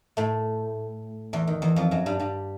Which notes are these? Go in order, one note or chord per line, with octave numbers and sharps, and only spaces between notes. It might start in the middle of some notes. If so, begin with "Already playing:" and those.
A2 A3
E2 E3
D#3
E2 E3
F2 F3
F#2 F#3
G2 G3
G2 G3